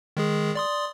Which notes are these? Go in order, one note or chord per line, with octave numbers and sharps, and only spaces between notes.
D#3 G#3 G#4
D5 C6 D#6